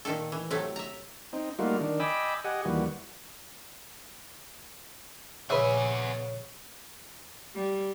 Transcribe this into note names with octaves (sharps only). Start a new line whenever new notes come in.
A#2 D#3 A3 A4
E3
A2 C3 F#3 A3
E5 A#5
C4 D#4
G3 A3 A#3 D#4 F4 F#4
D#3 D4
D#5 G5 G#5 B5 D6 E6
G4 D#5 F#5 G#5
D#2 E3 G3 F#4
A#1 C#3 B3 B4 E5 G#5
G3